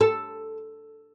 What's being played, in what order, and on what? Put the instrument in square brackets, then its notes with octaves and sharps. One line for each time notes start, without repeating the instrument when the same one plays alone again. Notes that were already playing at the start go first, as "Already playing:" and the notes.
[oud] A4